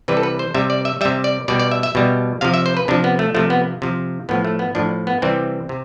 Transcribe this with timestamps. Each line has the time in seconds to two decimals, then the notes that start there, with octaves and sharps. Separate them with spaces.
0.08 C3 E3 G3 B4
0.17 A4
0.23 B4
0.39 C5
0.54 C3 G3 E5
0.70 D5
0.85 E5
1.01 C3 G3 E5
1.24 D5
1.48 B2 G3 D5
1.59 D5
1.72 E5
1.83 E5
1.95 B2 G3
2.41 C3 F3 F5
2.54 E5
2.66 C5
2.77 B4
2.88 C3 F3 D4
3.04 B3
3.19 A3
3.35 C3 F3 A3
3.50 B3
3.82 C3 F3
4.29 A2 F3 B3
4.45 A3
4.59 B3
4.75 A2 F3 D4
5.07 B3
5.22 C3 E3 G3 C4
5.69 C3